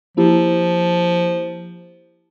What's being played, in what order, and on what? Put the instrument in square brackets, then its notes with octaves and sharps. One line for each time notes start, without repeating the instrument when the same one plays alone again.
[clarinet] F3 [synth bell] A#3 E4 G4